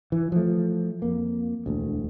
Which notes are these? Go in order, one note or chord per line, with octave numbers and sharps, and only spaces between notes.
E3
F3 A3
F2 A#3
E1 D2